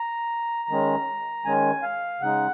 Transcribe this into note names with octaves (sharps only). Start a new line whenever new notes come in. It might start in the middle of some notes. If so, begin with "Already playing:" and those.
Already playing: A#5
D#3 G#3 C#4
D#3 G#3 C#4 G#5
F5
C#3 G#3 D#4 F#5